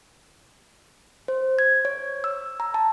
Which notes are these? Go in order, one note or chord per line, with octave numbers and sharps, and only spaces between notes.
C5
G#6
C#5
E6
A#5
A5